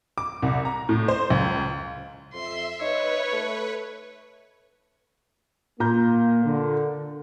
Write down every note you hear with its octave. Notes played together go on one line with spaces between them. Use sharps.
D6
C2
A#5
A2
C5
C#2
F2 E5 C6
D#4 B4 C#5
A3
A#2 A#3 A#5 G6
D3